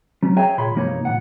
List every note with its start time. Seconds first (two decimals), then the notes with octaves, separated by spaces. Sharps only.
0.22 F#3 C#4
0.37 G#4 C#5 E5 G5 G#5 A#5
0.58 A#2 C#5 B5 C6
0.74 C2 G2 F3 A#3 D#4 C#5
1.05 A#2 E3 F#5